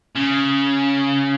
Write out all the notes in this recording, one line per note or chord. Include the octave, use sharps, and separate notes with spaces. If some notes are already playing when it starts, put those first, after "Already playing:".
C#3